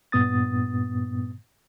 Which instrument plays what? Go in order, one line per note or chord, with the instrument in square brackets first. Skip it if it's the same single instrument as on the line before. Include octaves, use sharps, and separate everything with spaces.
[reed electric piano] G2 A#2 B3 D#6 A6